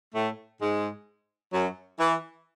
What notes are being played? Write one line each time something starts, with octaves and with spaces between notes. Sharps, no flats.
A2 A3
G#2 G#3
F#2 F#3
E3